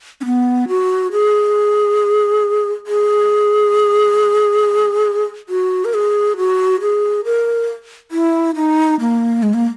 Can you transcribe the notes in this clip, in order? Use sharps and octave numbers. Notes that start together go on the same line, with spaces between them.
C#4
B3
F#4
G#4
G#4
F#4
A#4
G#4
F#4
G#4
A#4
E4
D#4
A#3
G#3
A#3